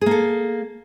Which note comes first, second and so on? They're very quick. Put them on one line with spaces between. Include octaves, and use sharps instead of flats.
G#4 A#3 A4